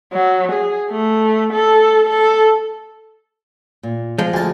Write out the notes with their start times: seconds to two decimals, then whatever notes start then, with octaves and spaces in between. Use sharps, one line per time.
0.13 F#3
0.52 G#4
0.90 A3
1.53 A4
2.10 A4
3.83 A#2
4.18 F3 G#3
4.34 D2 D3 G#5 A5